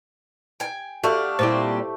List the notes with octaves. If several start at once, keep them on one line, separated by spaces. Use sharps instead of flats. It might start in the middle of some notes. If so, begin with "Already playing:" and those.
G5 G#5
A3 D4 F#4 G4 F5
A#2 G3 C4 E4 C5